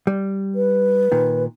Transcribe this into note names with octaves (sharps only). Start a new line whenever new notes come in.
G3
B4
A#2 D#3